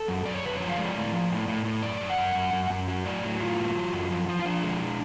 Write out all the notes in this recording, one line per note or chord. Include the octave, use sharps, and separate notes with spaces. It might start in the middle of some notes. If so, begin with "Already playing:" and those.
Already playing: A4
F#2
F#2 D5
C#5
F#2 B4
F3 C#5
F5
G#3 D5
A2
F3
A2
A2
A2
F#2 D5
F#2
F#5
F#2
F#2
F#2
F#2
F#3
A2 D5
F#3
A2 F4
F#3
F#3
F#2
F3
F3
F4
F3 D4
G#3